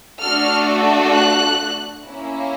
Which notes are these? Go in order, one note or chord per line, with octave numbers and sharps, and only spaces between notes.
A3 D4 F#4 A4 F6
F#6
A#3 C#4 E4